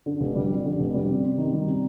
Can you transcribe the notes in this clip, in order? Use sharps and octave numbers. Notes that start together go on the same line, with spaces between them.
D3
F1
G3
F2
D3
F1
G3
C3
C4
D#3
G3
C3